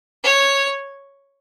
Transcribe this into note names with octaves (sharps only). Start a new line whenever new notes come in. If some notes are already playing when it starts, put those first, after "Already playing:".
C#5